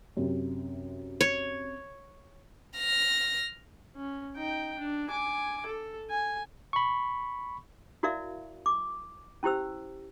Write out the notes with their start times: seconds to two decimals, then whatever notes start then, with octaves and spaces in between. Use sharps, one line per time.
0.17 F#2 C3
1.21 C#5
2.77 F6 A#6
3.96 C#4
4.36 D#4 G5
4.79 D4
5.09 G#5 D6
5.66 A4
6.10 G#5
6.73 B5 C#6
8.03 E4 F#4 A#4 D5 E5 F5
8.66 D6
9.43 C#4 E4 G4 C5 E6